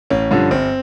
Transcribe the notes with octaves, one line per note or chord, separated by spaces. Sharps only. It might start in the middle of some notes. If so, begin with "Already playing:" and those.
A1 C#4
G2 D3 F3
G1 C4